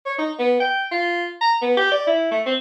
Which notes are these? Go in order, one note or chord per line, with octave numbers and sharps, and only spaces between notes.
C#5
D#4
B3
G5
F4
A#5
B3
G4
D5
E4
A3
C4